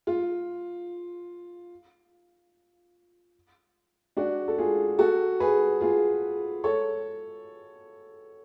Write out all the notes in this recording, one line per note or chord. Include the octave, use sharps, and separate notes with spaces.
F4
D4 F#4
A4
F4 G#4
F#4 A4
G#4 B4
F4 G#4
A4 C#5